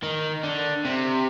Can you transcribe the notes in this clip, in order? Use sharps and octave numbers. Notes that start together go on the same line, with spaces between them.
D#3
D3
C3